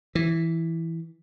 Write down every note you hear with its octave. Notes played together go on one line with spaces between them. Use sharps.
E3